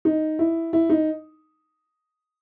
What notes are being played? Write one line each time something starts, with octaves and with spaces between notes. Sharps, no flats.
D#4
E4
E4
D#4